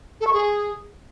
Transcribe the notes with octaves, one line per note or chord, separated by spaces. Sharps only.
A4
C#6
G#4